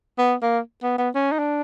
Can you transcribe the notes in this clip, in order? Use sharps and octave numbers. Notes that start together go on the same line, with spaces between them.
B3
A#3
B3
B3
C#4
D#4
D4